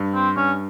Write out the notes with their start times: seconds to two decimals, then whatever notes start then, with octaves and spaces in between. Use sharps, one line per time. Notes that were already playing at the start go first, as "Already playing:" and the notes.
Already playing: G2
0.15 C4
0.36 G2 C#4